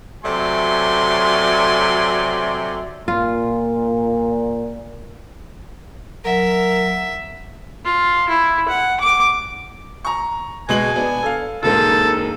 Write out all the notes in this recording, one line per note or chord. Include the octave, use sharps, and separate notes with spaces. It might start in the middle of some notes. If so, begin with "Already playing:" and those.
C3 F#3 A3 D5 G#5 C6
A#2 F4
F#3 A#4 E5 F#5
F4
E4
F#5
D6
A#5 C#6
B2 G#3 G#5 F#7
B3 D4
A4 F5
E1 G#2 A#3 A4